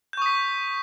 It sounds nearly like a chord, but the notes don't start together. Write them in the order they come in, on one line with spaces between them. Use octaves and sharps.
G6 C#6 D#6 B6